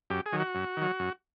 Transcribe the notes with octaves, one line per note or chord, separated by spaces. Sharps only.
F#2 G4
G#4
D#3 F#3
F#4
F#2
D#3 F#3
F#2